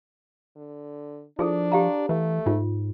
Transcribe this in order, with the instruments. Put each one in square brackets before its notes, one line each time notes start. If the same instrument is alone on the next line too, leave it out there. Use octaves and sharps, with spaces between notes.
[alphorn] D3
[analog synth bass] F3 [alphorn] D4 [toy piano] E4 G#4 A4
[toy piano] G4 F5 A#5
[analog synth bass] E3 [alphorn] A3
[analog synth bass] G#2 [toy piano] F4